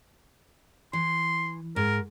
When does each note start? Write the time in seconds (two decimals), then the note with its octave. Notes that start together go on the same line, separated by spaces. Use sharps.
0.93 E3 C6
1.76 G#2 A#4